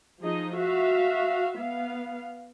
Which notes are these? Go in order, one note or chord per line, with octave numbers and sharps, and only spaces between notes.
F3 D#4 G#4 D#5
F#4 E5 F5
B3 F5